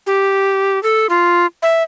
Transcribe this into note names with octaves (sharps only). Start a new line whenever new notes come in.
G4
A4
F4
E5